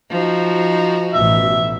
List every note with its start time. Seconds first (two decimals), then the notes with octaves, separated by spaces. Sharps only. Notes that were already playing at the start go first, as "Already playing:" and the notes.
0.10 F3 D#4 F#4
1.14 A1 B2 E5